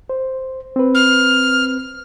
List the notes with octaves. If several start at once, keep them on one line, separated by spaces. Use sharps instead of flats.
C5
C4 B4
F6